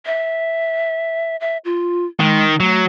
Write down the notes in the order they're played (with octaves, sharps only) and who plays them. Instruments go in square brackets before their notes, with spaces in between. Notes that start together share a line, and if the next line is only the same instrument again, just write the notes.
[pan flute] E5
E5
F4
[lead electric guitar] D#3 [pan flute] G#3
[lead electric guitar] F#3 [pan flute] A3